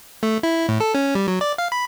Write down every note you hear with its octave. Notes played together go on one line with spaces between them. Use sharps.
A3
E4
A2
A4
C#4
G3
F#3
D5
F5
B5